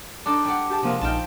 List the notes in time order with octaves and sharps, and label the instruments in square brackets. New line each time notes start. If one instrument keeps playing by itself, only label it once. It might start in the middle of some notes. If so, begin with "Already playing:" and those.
[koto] D4 D#4 A4 [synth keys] D6
[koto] G3 D5 F#5
[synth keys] G4 G#4 A5
[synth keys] C3 A#3 [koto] F3 G#3
[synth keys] A#1 D#4 F6 [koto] G5 A5